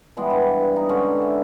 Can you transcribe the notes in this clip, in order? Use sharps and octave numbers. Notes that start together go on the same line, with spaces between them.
E3 G3 G#3 B3
G2
D#4
D3 G#3 C#4
E5